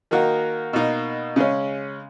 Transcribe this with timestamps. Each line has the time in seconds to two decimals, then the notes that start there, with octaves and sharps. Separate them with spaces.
0.11 D#3 A#3 D#4 F#4
0.73 B2 A#3 D#4
1.36 C#3 G#3 C#4